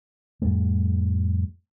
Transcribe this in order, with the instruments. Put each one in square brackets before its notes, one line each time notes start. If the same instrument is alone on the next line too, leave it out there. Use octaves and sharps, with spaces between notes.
[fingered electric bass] F2 A2 G3 A3